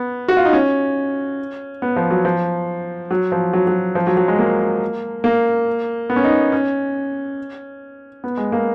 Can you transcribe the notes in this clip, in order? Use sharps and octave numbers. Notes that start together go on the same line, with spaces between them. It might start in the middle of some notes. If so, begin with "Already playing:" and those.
Already playing: B3
F#4
F4
D#4
C#4
B3
F3
F#3
F3
F#3
F3
F#3
F#3
F3
F#3
F#3
G#3
A#3
A#3
B3
C#4
D#4
C#4
B3
G#3
A#3